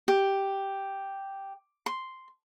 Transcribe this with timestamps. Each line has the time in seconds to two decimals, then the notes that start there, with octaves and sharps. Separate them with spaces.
0.08 G4
1.86 C6